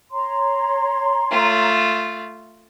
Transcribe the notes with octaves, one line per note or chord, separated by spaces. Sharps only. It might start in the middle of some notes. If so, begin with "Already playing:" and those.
C#5 A#5 C6
A3 F4